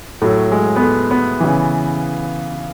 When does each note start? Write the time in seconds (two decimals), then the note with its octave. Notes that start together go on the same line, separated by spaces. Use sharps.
0.22 A2 F#3 A3
0.52 G#3
0.76 B3
0.81 A3
1.11 B3
1.40 C#3 E3